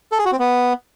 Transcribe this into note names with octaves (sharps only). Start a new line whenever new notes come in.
A4
G#4
F#4
C4
B3